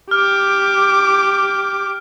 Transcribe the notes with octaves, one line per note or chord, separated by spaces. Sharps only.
G4 D6 F6